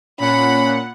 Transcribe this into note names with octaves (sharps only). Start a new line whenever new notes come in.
A#2 C#4 F#5 B5